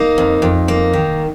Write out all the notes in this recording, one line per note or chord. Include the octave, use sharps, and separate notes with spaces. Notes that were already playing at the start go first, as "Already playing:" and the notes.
Already playing: A#3 D#4
F2
F2
A#3
D#3